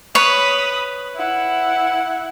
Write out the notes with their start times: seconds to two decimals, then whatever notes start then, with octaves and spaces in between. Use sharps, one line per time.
0.15 B4 C#5 B5 D#6
1.16 E4 F#5